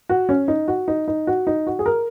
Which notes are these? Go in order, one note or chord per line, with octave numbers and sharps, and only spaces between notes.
F#4
C#4
D#4
F#4
D#4
D#4
F#4
D#4
F#4
G#4
A#4